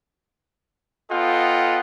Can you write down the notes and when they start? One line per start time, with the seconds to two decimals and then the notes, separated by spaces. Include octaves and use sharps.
1.11 B3 F4 A4 D#5 F#5 G5